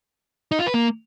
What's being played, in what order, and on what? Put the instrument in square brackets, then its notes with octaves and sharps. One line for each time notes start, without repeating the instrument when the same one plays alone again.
[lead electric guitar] D#4
F4
B4
A#3